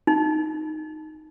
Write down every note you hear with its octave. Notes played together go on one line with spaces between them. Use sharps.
D#4